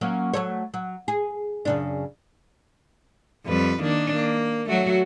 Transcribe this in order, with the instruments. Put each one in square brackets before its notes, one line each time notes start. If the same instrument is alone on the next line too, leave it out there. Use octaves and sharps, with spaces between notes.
[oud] F#3 A#3 C#4
F#3 A3 C#5
F#3
G#4
F#2 C#3 D4
[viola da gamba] F2 G3 B4
D#3 A#3 D4
A#3
F#3 A3 F#4